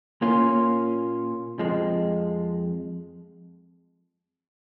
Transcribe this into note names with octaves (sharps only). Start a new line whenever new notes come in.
A#2 A#3 C#4 F4
F2 F3 G#3